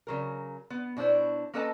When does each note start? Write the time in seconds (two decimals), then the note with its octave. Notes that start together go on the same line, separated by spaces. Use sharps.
0.07 C#3 F#3 A#4
0.70 B3
0.97 B2 D4 E4 C5 C#5
1.54 A#3 C#4 A4 B4 D#5 A5